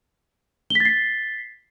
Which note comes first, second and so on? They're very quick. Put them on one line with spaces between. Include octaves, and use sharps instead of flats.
G7 B6 A6 C7